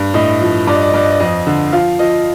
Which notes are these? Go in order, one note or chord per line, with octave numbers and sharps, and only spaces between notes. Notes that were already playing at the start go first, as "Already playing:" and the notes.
Already playing: G2
A2 D#5
F3
G2 D5
D#5
D5
D#5
G2 D5
D#5
D5
F2 D#5
D3
F3 F5
F3 D#5